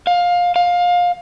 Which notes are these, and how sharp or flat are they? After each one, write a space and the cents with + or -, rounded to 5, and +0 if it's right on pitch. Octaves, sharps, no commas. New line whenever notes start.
F5 +20
F5 +20